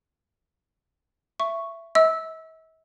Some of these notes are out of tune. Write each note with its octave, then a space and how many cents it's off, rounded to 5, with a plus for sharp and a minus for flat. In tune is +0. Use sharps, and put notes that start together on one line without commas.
E5 +20 C#6 +0
E5 -45 E6 -10